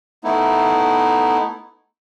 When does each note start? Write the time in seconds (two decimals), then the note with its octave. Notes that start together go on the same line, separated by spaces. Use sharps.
0.24 A3 B3 D#4 E4